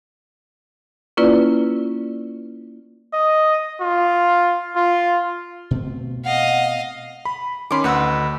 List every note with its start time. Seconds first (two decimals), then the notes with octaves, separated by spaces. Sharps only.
1.17 A#3 C#4 E4 F4 B4 D5
3.13 D#5
3.81 F4
4.76 F4
5.71 B2 A3 C4
6.25 D#5 F5 F#5
7.25 B5
7.71 D#3 C#4 B5 C6 D6
7.84 D2 B4 D#5 F#5 E6